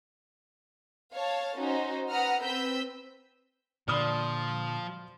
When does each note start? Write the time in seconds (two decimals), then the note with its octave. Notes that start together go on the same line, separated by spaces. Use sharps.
1.13 C#5 F5 A5
1.57 C#4 D#4 F#4 C5
2.10 B4 F#5 A#5 D#6 F6
2.42 C4 B4 E6 G6 B6
3.88 A#2 D3 F3 D5 B5 C6 D#6 F6